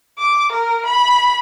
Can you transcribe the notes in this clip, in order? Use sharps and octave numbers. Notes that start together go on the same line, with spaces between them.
D6
A#4
B5